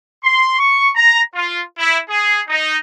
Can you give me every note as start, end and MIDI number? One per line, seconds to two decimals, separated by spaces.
0.24 0.57 84
0.59 0.89 85
0.96 1.21 82
1.35 1.62 65
1.78 1.99 64
2.09 2.40 68
2.49 2.78 63